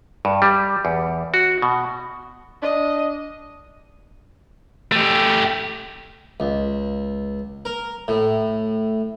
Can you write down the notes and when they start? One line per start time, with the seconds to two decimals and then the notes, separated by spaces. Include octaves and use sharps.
0.25 G2
0.42 G3
0.85 E2
1.34 F#4
1.62 B2
2.63 D4 D#5
4.92 A3 G4
6.40 C#2
7.65 A#4
8.08 A2